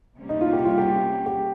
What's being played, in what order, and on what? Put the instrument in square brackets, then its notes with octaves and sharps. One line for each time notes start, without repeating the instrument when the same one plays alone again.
[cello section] C3 G3 A#3 C#4
[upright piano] D#4
F4
G4
F4
G4
G4